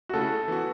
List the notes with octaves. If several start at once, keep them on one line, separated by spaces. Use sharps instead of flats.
F#4
C#3 A3 E4 A4
E3 B3 F#4